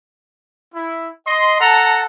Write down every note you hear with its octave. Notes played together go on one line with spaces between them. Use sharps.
E4
D#5 C6
A4 F#5 A5 A#5